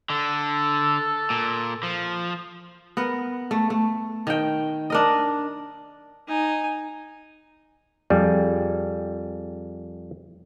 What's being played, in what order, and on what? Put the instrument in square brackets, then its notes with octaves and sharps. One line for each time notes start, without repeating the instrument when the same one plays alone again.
[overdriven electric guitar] D3 [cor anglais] A4
[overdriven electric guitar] A#2
F3
[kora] B3 A#4
A3
A3
D#3 G5
D4 A#4 D#5
[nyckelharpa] D#4 G#5
[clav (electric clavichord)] F2 G3 G#4